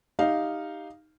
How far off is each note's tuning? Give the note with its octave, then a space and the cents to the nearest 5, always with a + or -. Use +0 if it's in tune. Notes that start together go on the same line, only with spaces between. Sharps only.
D#4 +0 G4 +5 F5 -5